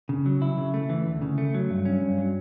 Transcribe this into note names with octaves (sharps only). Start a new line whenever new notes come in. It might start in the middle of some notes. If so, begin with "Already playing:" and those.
C#3
F#3
E4
C#3
A3
E3
D2
C#3
A3
F#3
G2
C#4
G2
F#3